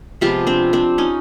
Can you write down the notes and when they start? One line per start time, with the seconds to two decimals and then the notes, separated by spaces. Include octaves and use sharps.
0.21 C3 F3 G#3 B3 F4 G4
0.47 C4 D4
0.73 C4 D4
0.98 C#4 D#4